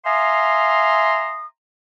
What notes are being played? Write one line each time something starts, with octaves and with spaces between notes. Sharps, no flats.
E5 F5 G#5 A#5 C6 D#6